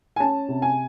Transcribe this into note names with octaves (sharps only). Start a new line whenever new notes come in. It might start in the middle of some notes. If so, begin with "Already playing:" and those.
G#5
C#4 A5
C3
G#5